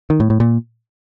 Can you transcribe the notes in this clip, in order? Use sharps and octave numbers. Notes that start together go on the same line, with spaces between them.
D#3
A2
A2
A#2